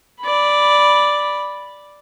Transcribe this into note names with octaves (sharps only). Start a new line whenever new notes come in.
D5 B5